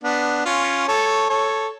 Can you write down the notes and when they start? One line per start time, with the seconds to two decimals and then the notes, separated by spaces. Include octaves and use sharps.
0.03 B3 D4
0.45 C#4 F4
0.88 A4 C#5
1.29 A4 C#5